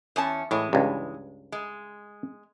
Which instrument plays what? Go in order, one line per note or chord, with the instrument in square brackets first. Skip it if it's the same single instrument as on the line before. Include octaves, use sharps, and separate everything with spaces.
[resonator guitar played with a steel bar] E2 C#4 A5
[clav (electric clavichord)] A2 [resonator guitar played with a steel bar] E3 G#3
[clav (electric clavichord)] C#2 G2
[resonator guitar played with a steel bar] G#3